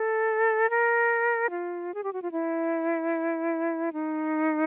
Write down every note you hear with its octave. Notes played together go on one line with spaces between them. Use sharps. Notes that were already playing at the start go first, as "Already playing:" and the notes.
Already playing: A4
A#4
F4
G#4
G4
F#4
F4
E4
D#4